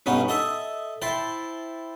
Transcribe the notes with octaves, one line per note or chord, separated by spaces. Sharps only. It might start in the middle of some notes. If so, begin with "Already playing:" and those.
B1 G2 B3 C#4 D#4
A4 D#5 E5
E4 C5 G5 A5